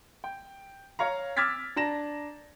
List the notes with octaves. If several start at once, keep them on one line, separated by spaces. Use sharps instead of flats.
G5
C#5 F5 A#5
D6 E6 F6 G#6 A6 B6
D4 A5 A#5 A#6 E7